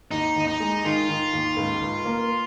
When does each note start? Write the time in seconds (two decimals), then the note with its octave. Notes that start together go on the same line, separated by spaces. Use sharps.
0.11 D#2 D#4
0.36 D#2
0.47 D#4
0.60 G#3
0.84 D#3 F4
1.09 D#3
1.33 D#2
1.57 C#2
1.82 C#2
2.05 A#3